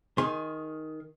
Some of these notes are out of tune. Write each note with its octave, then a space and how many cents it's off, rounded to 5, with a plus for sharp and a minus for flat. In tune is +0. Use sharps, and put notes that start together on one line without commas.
D#3 +10 G#4 +0 C6 +25